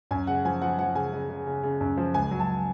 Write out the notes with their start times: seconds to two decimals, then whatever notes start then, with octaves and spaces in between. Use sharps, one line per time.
0.11 F#2 G#5
0.27 C#3 F#5
0.45 F3 G#5
0.62 F3 F#5
0.79 F3 F#5
0.95 C#3 G#5
1.13 C#3
1.30 C#3
1.47 C#3
1.63 C#3
1.81 F#2
1.97 F3
2.14 C#2 G#5
2.31 F#3
2.40 A5